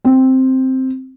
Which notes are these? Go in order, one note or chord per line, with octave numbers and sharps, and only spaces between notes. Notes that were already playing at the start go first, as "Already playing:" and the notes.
C4